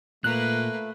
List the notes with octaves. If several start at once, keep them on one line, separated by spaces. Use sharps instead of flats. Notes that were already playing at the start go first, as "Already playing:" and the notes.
A#2 A3 A#3 B4 F#6